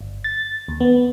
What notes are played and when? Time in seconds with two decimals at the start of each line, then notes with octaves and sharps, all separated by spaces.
0.01 G1
0.24 A6
0.68 D#2
0.80 B3